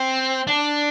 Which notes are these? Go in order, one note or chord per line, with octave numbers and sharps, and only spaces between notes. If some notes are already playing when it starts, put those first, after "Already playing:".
Already playing: C4
D4